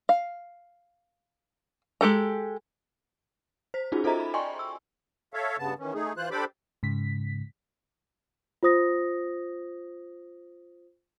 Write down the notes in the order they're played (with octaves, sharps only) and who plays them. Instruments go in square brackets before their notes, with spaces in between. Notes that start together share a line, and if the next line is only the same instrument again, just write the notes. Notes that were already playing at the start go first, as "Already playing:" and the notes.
[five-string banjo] F5
G#3 G4 A4 A#5
[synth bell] C5 B6
C#4 D#4 F4 F#4 G#4
F4 A4 C5 D#5 E5 A#5
B5
D5 D#5 G5 G#5 C6 C#6
E6
[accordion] A4 C#5 E5 F5
G2 C#3 B3 A5
D#3 E3 C#4
A3 D#4 G#4
E3 F4 C5 F#6
D4 G4 A4 C5 B5 D6
[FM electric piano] G#2 C#3 B6
[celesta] F4 C5 D#6 A#6